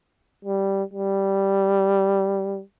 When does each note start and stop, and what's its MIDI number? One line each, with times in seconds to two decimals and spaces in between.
0.45 0.83 55
0.93 2.61 55